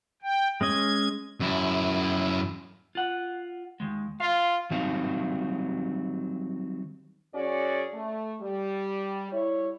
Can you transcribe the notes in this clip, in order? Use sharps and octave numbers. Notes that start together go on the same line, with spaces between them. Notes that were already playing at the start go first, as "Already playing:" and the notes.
G5
G#3 C#4 D#5 G#6
F#2 E4
F4 F#5
D#2 G#3
F4 F5
D#3 F#3 G3 C4 D#4 F5
F#2 C#4 F#4 G#4 D5
A3
G3
G3 E4 C#5